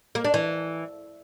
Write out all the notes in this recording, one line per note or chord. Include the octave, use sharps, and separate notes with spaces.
A#3
D4
E3